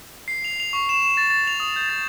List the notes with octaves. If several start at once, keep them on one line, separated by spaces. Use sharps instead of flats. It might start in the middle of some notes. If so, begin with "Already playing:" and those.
C7
F7
F7
C#6
E7
E7
A6
A6
F7
D#6
G6
A6